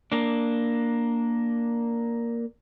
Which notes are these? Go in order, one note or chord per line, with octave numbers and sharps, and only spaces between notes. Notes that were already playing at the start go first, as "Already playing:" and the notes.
A#3 D4